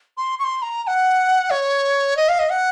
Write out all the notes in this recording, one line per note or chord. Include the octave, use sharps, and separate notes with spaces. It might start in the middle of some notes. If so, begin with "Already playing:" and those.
C6
C#6
C6
A#5
A#5
F#5
C#5
D#5
F5
D#5
F#5